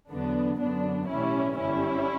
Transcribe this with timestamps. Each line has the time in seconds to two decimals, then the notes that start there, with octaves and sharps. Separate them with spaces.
0.11 E2 D3 F#3 B3 D4
0.60 F#2 D3 F#3 B3 D4
1.09 B1 A2 E3 G3 C#4 E4
1.58 G1 F#2 D3 G3 C#4 E4